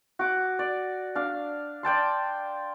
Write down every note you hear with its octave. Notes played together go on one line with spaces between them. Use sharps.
F#4 D6
D5
D4 F5
D5 G5 A5 C6